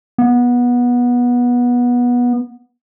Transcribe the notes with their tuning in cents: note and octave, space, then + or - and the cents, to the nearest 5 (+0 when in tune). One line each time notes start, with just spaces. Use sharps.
B3 -20